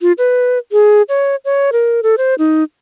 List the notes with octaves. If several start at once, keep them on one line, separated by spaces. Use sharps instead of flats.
F4
B4
G#4
C#5
C#5
A#4
A4
C5
D#4